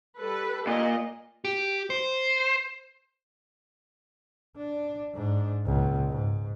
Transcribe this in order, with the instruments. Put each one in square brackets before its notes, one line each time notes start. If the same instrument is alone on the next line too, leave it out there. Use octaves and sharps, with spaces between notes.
[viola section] G3 A4 B4
[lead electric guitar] A#2 [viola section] D#5
[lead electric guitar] G4
C5
[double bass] D4
G#2 D4
C#2 A#2
G#2